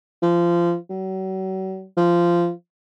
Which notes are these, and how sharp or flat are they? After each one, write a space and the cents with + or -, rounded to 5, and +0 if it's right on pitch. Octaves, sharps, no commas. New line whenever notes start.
F3 -20
F#3 +40
F3 -15